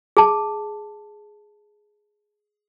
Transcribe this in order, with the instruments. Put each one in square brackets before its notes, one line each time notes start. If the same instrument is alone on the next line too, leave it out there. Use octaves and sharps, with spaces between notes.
[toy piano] G#4 A5